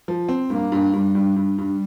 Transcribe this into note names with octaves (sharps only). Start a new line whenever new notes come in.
F3
C4
G2 A#3
G2
G2 G3
G2
G2 G3
G2